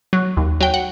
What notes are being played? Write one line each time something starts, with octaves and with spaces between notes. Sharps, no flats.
F#3
D#2
F#3 G5
F#5